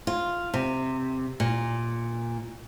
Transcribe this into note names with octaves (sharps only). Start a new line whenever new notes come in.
F4
C3
A#2